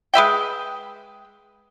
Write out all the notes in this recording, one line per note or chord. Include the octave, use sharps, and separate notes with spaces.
G#3 B4 E5 G5